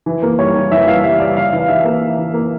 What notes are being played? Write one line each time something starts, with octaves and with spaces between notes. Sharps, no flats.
E3
A#3
G3 C#5
E3
E3 E5
G3 F5
G3 E5
G3 D5
E3 F5
E3
F5
E3 E5
A#3
E3
E3
A#3